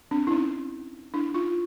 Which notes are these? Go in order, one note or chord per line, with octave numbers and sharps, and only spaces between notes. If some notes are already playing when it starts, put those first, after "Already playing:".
C4 D4
E4
C#4 D#4
D4 E4
D#4 F4